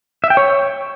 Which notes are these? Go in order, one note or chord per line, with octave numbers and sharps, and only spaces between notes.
E5
G5
C#5